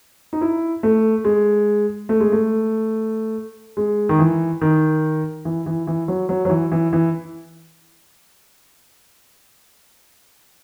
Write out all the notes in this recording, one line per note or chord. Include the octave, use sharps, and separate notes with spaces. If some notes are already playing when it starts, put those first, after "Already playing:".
D#4
E4
A3
G#3
A3
G#3
A3
G#3
D#3
E3
D#3
E3
E3
E3
F#3
F#3
F#3
E3
E3
E3